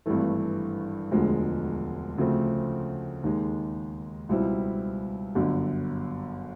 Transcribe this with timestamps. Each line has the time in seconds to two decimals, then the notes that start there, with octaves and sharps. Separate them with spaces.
0.06 G#1 G2 E3 A3
1.11 E1 D2 D3 F3 G#3
2.18 D2 C#3 F3 A3 C4
3.23 D#2 D#3 G#3
4.29 C#2 B2 G3 C4 E4
5.35 G1 F#2 D3